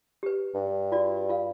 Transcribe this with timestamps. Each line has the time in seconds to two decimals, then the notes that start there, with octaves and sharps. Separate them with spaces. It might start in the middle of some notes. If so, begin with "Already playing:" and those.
0.23 G4 B4
0.54 G2
0.92 F4 F#4 D5
1.29 F4 F5